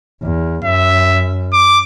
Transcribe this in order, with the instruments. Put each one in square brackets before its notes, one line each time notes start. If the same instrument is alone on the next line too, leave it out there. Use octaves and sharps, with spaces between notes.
[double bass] E2
[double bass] F#2 [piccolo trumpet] E5
[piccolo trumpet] D6